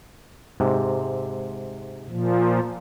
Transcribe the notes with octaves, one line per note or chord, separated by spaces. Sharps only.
G#2 C3
A#2 F3